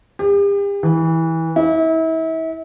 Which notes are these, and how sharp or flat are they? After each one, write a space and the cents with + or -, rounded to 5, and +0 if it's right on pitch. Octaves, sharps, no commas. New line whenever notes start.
G4 +40
E3 -20
E4 -35